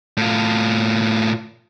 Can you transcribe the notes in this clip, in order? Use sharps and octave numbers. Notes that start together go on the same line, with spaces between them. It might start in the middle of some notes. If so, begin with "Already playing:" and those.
A2 F4